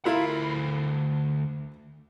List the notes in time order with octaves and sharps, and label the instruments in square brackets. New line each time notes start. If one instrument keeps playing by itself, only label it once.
[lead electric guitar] D2 B5 [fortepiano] E4 F4 A#4